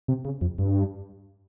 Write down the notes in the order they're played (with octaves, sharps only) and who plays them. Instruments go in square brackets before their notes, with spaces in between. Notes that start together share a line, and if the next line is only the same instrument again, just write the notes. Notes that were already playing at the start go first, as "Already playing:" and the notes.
[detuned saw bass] C3
C#3
F2
G2